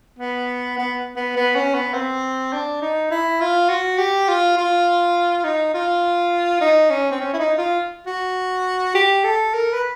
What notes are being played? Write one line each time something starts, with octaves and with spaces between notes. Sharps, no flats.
B3
B3
B3
B3
C#4
B3
C4
D4
D#4
E4
F4
F#4
G4
F4
F4
D#4
F4
D#4
C#4
C4
C#4
E4
D#4
F4
F#4
G4
A4
A#4
B4